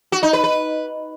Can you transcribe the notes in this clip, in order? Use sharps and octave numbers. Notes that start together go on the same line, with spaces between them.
F#4
D#4
B4
B4